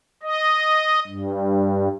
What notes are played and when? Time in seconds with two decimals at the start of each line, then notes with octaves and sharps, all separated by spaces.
0.23 D#5
1.07 G2